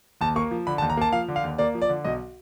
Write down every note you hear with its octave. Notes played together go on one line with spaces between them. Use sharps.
D#2 A5
A#3 C#6
F3
D3 B5
A5
D#2
A#5
A#3 A5
F3 F5
D3
F5
D#2
A#3 D5
F3
D5
D3
B1 D#5